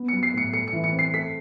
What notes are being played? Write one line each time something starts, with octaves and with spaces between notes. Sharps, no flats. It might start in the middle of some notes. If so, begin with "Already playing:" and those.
Already playing: B3
F#3 C#7
C7
A2 C#7
A3 C#7
C#7
E3
C#7
C4
C7
A3 B6